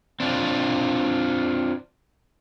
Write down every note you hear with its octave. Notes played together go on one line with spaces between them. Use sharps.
C4 D4 F4